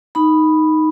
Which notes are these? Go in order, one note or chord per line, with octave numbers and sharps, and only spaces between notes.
D#4 B5